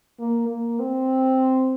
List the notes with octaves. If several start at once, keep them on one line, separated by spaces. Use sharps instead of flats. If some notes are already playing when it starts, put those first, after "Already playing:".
A#3
A#3
C4